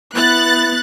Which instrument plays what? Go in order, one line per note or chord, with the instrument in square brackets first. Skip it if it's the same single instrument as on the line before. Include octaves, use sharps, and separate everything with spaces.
[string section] B3 F#6 A6 [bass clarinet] E4